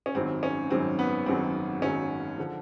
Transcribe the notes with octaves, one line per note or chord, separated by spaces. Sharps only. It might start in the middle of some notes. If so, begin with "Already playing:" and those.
C#4
G#1 F#2 D#3 F#3 C4
C#4
G#1 F#2 D#3 F#3 C4
B3
G#1 F#2 D#3 F#3 C4
G#1 F#2 D#3 F#3 C#4
D3 F3